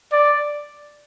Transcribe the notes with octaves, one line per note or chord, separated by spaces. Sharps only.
D5